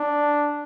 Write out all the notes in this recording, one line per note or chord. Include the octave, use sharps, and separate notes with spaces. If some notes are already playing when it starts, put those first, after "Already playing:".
Already playing: D4